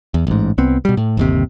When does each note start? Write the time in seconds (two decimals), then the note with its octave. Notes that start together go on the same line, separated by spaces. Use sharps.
0.14 E2
0.27 A1 G#2
0.58 C2 B3 C4
0.85 B2 G3
0.97 A2
1.17 G1 D#2 C3